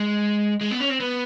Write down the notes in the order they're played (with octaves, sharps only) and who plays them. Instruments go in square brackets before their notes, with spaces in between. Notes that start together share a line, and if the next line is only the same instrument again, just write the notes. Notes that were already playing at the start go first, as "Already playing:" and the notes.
Already playing: [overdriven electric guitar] G#3
G#3
B3
C#4
C4
B3